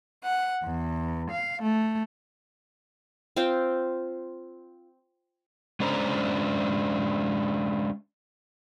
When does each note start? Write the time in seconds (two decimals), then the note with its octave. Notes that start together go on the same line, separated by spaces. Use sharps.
0.24 F#5
0.64 E2
1.30 F5
1.62 A3
3.36 C4 F4 F5 G5
5.80 G#3 C#4 D4 C5 A5 A#5